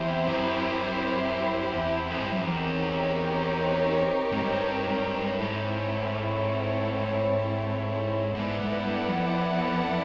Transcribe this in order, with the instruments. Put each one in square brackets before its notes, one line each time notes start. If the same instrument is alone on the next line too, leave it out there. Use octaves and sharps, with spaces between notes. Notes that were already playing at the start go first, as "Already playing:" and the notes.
Already playing: [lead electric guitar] E2 [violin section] C4 E4 G4 C5
[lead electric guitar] F#2
E2
F2
G#2
G2
F#2
F2
[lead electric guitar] E2 [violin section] C4 D#4 G4 A#4 C#5
[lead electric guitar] G#2
G2
[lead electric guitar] G#2 [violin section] C4 E4 A4 C#5
[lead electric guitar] G#2 [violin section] B3 E4 A4 D5 F#5
[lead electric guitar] G#2
G2
F2